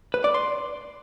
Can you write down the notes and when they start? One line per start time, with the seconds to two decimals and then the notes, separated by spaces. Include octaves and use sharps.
0.14 B4
0.24 D5
0.34 C6